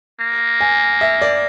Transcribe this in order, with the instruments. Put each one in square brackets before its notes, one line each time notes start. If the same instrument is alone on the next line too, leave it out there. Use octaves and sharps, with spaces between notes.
[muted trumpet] A#3
[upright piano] G#5
E5
D5